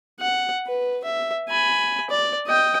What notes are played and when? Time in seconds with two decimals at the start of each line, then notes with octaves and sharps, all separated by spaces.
0.20 F#5
0.67 B4
1.04 E5
1.49 G#5 B5
2.10 D5
2.47 D#5 G5